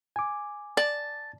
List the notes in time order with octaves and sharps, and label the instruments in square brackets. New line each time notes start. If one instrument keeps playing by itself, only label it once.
[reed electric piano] G#5 D6
[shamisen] D5 [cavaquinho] A5